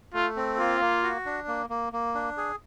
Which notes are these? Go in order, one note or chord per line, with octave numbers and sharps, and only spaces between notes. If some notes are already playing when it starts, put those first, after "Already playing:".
A3 F4
C4
A#3 F4
A#3
F#4
D4
A#3
A#3
A#3
D4
G#4